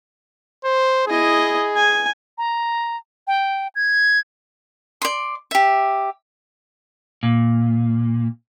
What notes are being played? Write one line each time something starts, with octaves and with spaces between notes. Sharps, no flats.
C5
E4 G#4 D#5
G#5
A#5
G5
G#6
D5 C6
G4 E5
A#2